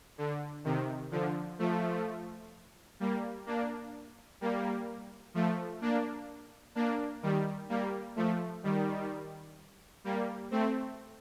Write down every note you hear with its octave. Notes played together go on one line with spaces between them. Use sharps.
D3
C3 D#3
D3 F3
F3 A3
G3 A#3
A#3 D4
G3 A#3
F3 A3
A#3 D4
A#3 D4
D#3 G3
G3 A#3
F3 A3
D#3 G3
G3 A#3
A3 C4